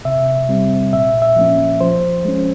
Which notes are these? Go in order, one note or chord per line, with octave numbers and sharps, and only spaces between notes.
C3 E5
G3 C4
A#2 E5
E5
F3 A#3 C#4
F3 C5
G#3 C#4